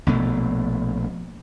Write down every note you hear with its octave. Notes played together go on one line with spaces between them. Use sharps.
A#1 B2 A3